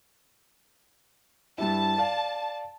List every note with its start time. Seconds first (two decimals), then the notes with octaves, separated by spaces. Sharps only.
1.58 G2 G3 E4 A5
1.98 D5 F5